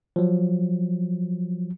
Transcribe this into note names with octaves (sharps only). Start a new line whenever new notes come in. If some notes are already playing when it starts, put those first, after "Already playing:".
F3 F#3